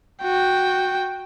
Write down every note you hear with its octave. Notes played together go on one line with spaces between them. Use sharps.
F#4 G5